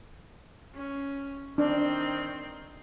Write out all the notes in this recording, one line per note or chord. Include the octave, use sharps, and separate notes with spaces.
C#4
D#3 C4 D4